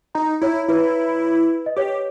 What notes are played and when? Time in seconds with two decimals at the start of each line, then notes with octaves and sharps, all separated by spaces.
0.15 D#4 A#5
0.41 E4 C#5
0.68 E4 B4
1.66 D#5
1.76 G4 C#5